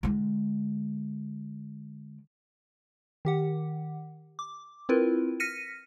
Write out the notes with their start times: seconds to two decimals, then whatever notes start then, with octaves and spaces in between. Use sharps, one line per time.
0.03 D3 G#3
3.25 D#3 G4 F#5
4.39 D6
4.89 C4 E4 F4 A#4 B4
5.40 F6 A#6 B6 C#7 D#7